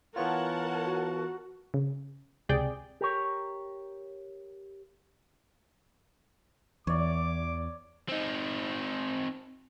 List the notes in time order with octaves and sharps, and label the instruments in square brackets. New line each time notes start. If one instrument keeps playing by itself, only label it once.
[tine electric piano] E3 B3 F4 [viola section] A#4 F#5 A5 [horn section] C#5
[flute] F#4
[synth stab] C#3
C#2 C3 G#4 D5 G5
[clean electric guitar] G4 A#4 C#5
[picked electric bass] E2 [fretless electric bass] E3 [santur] C#5 D5 [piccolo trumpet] D6
[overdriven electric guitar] C4 D#4